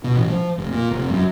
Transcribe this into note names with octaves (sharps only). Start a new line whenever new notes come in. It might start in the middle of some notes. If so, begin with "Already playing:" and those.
B2
A1
F3
F1
A#2
F1
F#2